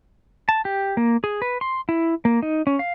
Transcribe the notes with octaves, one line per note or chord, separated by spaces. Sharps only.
A5
G4
A#3
G#4
B4
C6
E4
A#3
D#4
C#4
F5